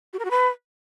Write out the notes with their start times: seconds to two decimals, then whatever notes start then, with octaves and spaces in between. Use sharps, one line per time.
0.13 F#4
0.19 A#4
0.25 F#4
0.31 B4